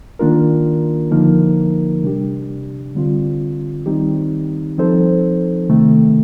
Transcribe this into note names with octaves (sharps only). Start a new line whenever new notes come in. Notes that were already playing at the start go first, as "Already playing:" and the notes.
D#3 A#3 D4 F4 A#4
D3 F3 A#3 D#4 A#4
C3 G3 D4 G4
D3 G3 C4 F4
D#3 G3 C4 D#4 G4
F3 C4 D#4 A4 C5
C3 D#3 A3